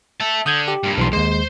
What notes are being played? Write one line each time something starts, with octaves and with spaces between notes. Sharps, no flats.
E5 A5
D3 D#6 G6 G#6
G4
G2 A#2
B1 E3 C6
D#2 G#3 C5 C6